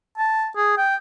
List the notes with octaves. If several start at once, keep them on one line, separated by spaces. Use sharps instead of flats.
A5
G#4
G5